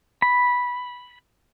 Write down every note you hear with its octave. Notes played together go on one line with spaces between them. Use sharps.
B5